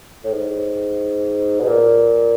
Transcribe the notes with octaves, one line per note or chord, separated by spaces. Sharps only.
A2
G#2
B2
A#2